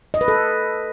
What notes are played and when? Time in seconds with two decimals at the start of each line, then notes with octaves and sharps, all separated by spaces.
0.14 D#5
0.21 B4
0.28 A4